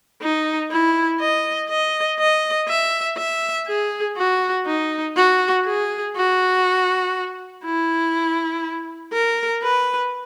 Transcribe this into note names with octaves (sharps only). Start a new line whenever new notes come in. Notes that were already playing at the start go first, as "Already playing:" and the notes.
D#4
E4
D#5
D#5
D#5
E5
E5
G#4
F#4
D#4
F#4
G#4
F#4
E4
A#4
B4